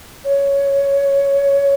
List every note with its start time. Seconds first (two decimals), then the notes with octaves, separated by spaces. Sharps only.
0.25 C#5